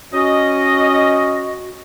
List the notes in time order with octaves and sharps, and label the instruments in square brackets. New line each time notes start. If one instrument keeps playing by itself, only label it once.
[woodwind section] C#4 D#5 [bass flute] F#4